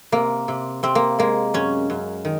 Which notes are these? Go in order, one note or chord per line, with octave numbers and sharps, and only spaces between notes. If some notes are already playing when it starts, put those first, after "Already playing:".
C3 A#3
C3
C3 C4
A#3
G#3 A#3
F#2 C#4
F#2
D#3